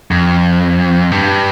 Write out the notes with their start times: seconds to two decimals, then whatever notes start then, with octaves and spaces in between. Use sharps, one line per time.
0.11 F2
1.12 G2